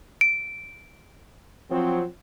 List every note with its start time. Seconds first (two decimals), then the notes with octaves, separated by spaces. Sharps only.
0.21 D7
1.69 F3 F#3 C4